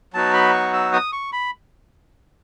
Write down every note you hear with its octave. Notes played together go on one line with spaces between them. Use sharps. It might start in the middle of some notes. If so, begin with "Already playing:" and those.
F#3 B3 D#4 F#4 A5
B5
C#6
E6
D#6
C#6
B5